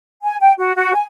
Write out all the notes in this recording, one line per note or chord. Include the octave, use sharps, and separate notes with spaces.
G#5
G5
F#4
F#4
G#5